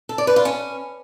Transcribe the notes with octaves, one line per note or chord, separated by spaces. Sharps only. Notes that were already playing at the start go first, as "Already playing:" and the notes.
A4
D5
B4
F4
C#4